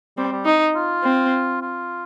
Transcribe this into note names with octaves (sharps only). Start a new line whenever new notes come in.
G3 C4
G3
D#4
F4
C4
F4